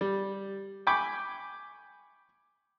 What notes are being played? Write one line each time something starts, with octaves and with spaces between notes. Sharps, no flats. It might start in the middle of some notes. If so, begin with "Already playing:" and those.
G3
G5 G#5 B5 C#6 D6